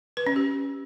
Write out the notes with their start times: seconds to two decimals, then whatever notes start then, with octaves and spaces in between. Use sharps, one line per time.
0.17 B4
0.27 C#4
0.36 G4